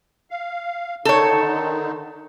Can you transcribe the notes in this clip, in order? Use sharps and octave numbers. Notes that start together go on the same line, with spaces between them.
F5
D3 D#3 D#4 A4 C#5